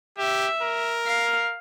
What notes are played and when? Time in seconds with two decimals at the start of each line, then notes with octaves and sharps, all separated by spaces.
0.18 G4 E5
0.63 A#4
1.07 F5